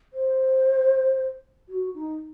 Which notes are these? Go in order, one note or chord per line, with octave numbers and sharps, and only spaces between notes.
C5
F#4
D#4